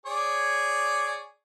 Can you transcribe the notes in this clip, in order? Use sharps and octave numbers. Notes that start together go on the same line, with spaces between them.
G#4 C#5 D5